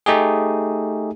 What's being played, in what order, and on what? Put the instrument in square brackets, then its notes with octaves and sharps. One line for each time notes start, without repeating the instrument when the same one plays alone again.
[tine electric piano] A3 D#4 G4 G#4